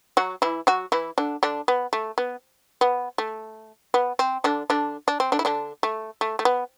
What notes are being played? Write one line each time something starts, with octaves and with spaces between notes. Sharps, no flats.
F#3 F#4
E3 E4
F#3 F#4
E3 E4
D3 D4
D3 D4
B3
A3
B3
B3
A3
B3
C4
D3 D4
D3 D4
D4
C4
D3 D4
E4
D3 D4
A3
A3
A3
B3